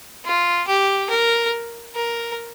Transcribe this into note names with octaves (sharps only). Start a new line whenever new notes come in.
F4
G4
A#4
A#4